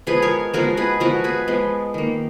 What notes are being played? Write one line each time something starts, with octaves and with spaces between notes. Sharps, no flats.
F3 G#3 B3 G#4 B4
A#4 C#5
F3 G#3 B3 F#4 A#4
G#4 B4
F3 G#3 B3 F#4 A#4
G#4 B4
F3 G#3 B3
D#3 A#3